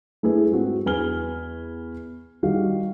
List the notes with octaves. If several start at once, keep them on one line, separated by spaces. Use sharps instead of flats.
A3 E4 G#4 B4
G#2 C4 F#4
E2 B4 G#5 F6 G7
D#3 G3 F#4 F5